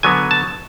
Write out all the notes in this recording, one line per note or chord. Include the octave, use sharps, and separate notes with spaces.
D3 F#3 B3 G#5
A5